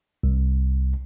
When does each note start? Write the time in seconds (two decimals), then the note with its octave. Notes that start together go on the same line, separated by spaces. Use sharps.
0.23 C2